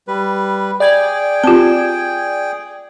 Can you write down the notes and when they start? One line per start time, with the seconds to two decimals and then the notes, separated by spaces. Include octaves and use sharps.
0.08 G3 B4
0.80 G#4 D5 G5 G#6
1.44 C4 F4 G4 A5